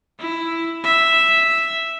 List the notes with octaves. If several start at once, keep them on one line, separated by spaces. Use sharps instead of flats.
E4
E5